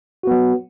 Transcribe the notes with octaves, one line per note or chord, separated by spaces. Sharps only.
F#3 B3 F#4